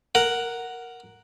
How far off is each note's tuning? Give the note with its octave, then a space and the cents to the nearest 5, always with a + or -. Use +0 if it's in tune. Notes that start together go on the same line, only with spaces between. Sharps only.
A#4 +0 F#5 +0